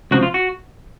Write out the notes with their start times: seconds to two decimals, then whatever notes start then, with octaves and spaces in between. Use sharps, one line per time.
0.11 C#2 C3 F3 C4 F#4
0.23 F4
0.34 F#4